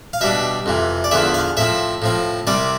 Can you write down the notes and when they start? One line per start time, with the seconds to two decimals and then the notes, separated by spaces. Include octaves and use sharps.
0.13 F5
0.21 B2 G3 D4 E5
0.66 F2 C3 E3
1.04 D5
1.11 E2 D3 F3 B3 E5
1.34 F5
1.57 A2 F3 C4 E5
2.02 A2 F3 C4
2.47 C2 C3 G3 C4 D5